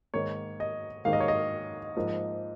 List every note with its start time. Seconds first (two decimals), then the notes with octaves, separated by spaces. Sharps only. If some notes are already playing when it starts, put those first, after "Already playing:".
0.14 G#2 D#3 A#3 C#5
0.60 D#5
1.05 G#2 D#3 A#3 F5
1.13 D#5
1.20 C#5
1.28 D#5
1.96 G#2 F3 A#3